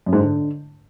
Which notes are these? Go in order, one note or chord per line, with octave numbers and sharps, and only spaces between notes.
F#2
G#2
D3